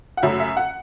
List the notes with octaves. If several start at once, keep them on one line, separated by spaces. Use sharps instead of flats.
F#5
F#2 C#3 F#3 A3 E5
E5
F#5